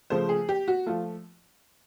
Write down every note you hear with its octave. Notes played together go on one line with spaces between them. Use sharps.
C#3 F3 A3 C5
G#4
G4
F#4
F3 A3 F4